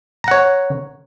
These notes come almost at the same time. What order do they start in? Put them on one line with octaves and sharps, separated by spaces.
A#5 F#5 C#5